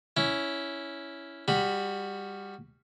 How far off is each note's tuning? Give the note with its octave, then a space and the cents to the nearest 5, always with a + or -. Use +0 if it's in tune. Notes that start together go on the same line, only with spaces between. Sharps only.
C#4 +10 E4 +0
G3 +20 F#4 +0 B5 -5